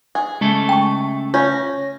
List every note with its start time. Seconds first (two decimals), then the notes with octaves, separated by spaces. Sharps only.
0.15 G#4
0.41 C#3 G#3 A3 A4
0.69 G5 A5 C#6
1.34 C#4 F4 C#5 F5 A#6